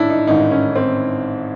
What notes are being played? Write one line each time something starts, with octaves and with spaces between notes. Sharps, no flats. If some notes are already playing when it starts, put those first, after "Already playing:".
Already playing: A1 G#2 D#3 C#4 D4 E4
D#4
A1 G#2 D#3 D#4
C#4
C4